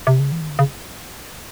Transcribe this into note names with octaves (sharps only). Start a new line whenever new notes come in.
C3
C#3
E3
D#3
D3
C#3